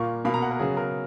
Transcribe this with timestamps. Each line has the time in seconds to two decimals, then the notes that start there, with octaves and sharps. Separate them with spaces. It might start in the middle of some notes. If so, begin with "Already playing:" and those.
Already playing: A#2 A#3 C#6
0.25 B2 A#3 B5
0.34 A#5
0.42 F#5
0.51 A#4
0.59 C#3 F#3 B3 G#4
0.77 A#4